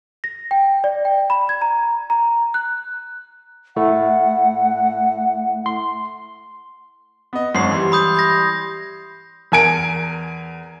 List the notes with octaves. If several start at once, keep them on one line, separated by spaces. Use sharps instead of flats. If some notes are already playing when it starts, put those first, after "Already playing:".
A#6
G5
D5
G5
B5
G#6
A#5
A#5
F#6
A3 E4 F#5
C6
B3 D#5
G#1 F#2 C6 C#6 C7
E3 G3
B5 D#6 G6
G6 G#6 A#6
E2 A#4 G#5 G#6 D7